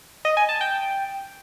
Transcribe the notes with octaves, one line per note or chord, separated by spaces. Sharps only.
D#5
G#5
A5
G5